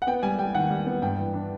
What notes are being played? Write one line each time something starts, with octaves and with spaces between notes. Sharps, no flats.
F#5
B3 G5
G3 G#5
G3 G5
D#3 F#5
G3
B3
G2 G5
E3
D4